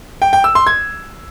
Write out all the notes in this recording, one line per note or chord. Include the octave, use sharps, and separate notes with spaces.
G5
G5
E6
C6
G#6